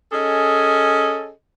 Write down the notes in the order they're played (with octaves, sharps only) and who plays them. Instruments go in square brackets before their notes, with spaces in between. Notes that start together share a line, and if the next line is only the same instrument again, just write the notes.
[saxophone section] C#4 G#4 A4 D#5